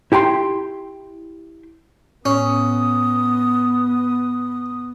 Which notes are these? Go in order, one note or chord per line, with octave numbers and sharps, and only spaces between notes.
E4 G4 G5 A#5 C6
A2 B3 C#4 D#6